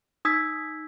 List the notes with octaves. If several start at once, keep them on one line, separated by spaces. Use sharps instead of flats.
D#4 D#6 E6 G#6 B6